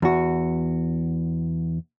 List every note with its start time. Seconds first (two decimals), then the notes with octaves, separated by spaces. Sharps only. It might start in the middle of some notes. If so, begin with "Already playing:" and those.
0.02 E2 F#4